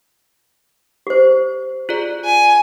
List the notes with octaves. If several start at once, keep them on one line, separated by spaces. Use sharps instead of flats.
G4 C5
F4 G#4 D5
G#5